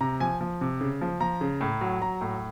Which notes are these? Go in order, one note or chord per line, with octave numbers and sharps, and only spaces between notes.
C3 A#5
F3 G#5
F3
C3
C#3
F3
F3 A#5
C#3
A2
F#3
F#3 A#5
A2